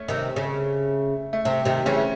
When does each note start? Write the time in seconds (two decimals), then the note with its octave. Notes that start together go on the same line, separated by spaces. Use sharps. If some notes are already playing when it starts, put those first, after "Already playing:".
Already playing: A3 C#4
0.08 C3 D#3
0.36 C#3
1.33 A3
1.45 C3 C4
1.65 C3 D#3 C4
1.86 C#3 E3 A3 C#4